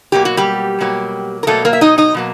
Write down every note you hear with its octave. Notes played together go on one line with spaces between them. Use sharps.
B2 F#3 A#3 G4
F#4
G3 G4
B2 F#3 A#3
A#4
B2 F#3 A3 A#3 A4
A#3 A#4
E5
D#4 D#5
D#4 D#5
B2 F#3 A#3